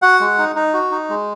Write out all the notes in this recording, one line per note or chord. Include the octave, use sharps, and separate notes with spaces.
F#4 F#5
G#3
D#4
D#4
F#4
D#4
G#3